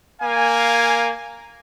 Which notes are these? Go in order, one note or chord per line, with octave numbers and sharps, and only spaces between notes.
A#3 F5 G#5